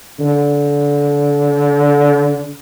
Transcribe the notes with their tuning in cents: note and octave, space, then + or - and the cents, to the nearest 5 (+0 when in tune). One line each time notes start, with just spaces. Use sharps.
D3 -25